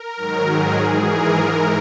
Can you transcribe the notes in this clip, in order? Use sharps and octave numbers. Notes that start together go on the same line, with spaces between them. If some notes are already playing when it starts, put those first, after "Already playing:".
Already playing: A#4
G#2 D#3 F#3
G#4
G#2 E3 G#4
A#4
G#2 E3